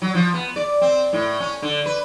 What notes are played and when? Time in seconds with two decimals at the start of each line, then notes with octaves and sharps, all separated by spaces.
0.02 F#3
0.15 F3
0.34 B3
0.56 D5
0.81 C4
1.13 A2
1.40 C#4
1.62 D3
1.86 B4